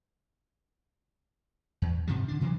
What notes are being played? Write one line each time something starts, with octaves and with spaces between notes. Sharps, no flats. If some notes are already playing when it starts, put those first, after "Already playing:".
E2
G#2 C3 F3 G3
D3 D4
C3 E3 F#3 G#3